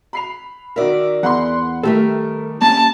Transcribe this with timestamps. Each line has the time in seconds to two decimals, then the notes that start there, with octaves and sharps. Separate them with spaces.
0.13 B5 C7 F7
0.76 D#3 F#4 A#4 D5 E5
1.23 E2 F#5 B5 C6
1.83 D#3 G3 A3 A4 A#4 E5
2.62 A#3 C#4 A5